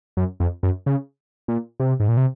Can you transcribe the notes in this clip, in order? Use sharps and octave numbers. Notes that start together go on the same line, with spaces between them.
F#2
F2
F#2
C#3
A#2
C3
G#2
A#2
C3